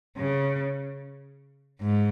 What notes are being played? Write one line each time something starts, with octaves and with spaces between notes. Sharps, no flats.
C#3
G#2